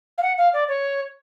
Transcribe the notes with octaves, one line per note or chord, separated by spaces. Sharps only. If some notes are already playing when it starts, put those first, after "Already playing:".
F5
F#5
F5
D5
C#5